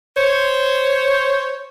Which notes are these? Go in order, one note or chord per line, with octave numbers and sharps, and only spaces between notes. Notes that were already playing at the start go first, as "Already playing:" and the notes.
C5 C#5